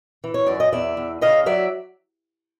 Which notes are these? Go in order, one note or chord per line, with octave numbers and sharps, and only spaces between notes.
E3
C#5
F#2 D5
D#5
E2 D5 E5
E2
C#3 D#5 F5
F#3 D5 E5